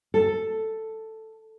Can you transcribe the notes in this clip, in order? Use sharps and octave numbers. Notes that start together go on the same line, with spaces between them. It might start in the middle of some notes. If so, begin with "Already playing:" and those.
A4